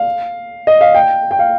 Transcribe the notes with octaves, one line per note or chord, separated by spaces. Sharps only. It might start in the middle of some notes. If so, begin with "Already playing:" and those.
Already playing: F5
D#5
F5
G5
G5
F5